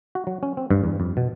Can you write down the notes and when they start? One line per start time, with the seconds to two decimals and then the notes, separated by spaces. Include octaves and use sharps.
0.15 F#4
0.27 F#3
0.43 C#4
0.57 C4
0.70 G2
0.84 E2
1.00 F2
1.17 B2